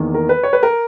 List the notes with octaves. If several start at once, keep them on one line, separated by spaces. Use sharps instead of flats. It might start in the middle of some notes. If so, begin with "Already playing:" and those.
Already playing: E2 D#3 A#3
A#4
B4
C#5
B4
A#4